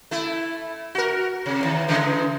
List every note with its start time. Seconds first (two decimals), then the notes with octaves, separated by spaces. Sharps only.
0.11 A3 E4
0.95 F#4 A#4
1.46 C3
1.61 E2 D#3
1.88 C#3 E3 G#3